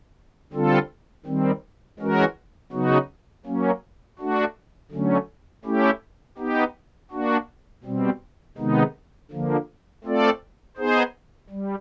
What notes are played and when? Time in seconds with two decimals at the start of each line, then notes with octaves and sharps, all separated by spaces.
0.53 D3 G3 C4 F4 A4
1.26 D#3 G3 C4
1.99 E3 G#3 C#4 F#4 A#4
2.72 C#3 F#3 B3 D#4 F#4
3.46 F#3 A#3 C#4
4.19 A3 D4 F#4
4.91 D3 F#3 A3 C#4
5.65 A3 C#4 E4 G4
6.38 B3 D#4 G4
7.11 A#3 D4 F#4
7.84 B2 G3 C4
8.58 C3 D#3 G#3 B3 D#4
9.31 D3 F3 A#3
10.04 A3 C4 F4 A4 D5
10.77 B3 D#4 G#4 C5
11.50 G3